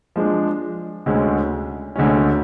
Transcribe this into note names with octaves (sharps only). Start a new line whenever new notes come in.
F3 G#3 D4
D2 D3 G#3 C#4
D2 D3 G#3 C#4